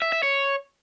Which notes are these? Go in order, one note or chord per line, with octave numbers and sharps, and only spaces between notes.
E5
E5
C#5